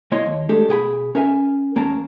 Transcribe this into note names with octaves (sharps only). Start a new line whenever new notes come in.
B1 A#3 E4 C#5 D#5 C6
D#2
G#3 A3 D4 G4 A4
B2 G#4 G5 B5
C#4 A#4 E5 G#5
E2 A#3 C#4 A5 A#5